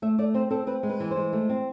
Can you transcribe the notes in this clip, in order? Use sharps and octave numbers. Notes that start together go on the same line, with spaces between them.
A3 E5
A3 D5
C4 C5
C4 A4
C4 B4
G#3
B4
E3
G#3 C5
A3
C4